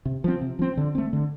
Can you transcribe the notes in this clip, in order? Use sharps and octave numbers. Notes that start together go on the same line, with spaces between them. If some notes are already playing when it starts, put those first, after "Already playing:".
C3
F3 C4
C3
F3 C4
D3
A3 C4
D3